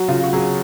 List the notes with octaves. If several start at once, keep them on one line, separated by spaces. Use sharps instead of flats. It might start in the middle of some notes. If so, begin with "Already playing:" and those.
Already playing: F#3 F#4
C#3 F4
F#4
F#3 G#4